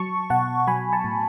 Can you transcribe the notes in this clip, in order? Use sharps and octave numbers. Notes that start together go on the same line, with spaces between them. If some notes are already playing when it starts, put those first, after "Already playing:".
Already playing: F#3 A5 C#6
B2 F#5 A5
F#3 G#5 B5
A5 C#6
A2